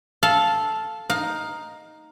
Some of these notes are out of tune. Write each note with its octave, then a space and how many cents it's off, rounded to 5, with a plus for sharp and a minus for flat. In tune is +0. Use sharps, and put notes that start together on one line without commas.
A4 -5 F5 +0
D#4 +0 F5 +20